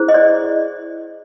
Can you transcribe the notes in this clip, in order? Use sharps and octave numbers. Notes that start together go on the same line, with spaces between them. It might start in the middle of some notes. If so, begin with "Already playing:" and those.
Already playing: E4 G#4 C5
D#5
D5